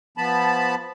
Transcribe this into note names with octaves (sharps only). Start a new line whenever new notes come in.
F3 B3 A5 B5